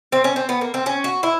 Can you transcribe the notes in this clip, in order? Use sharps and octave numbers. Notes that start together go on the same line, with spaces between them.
C4
C#4
C4
B3
A#3
C4
C#4
F#4
E4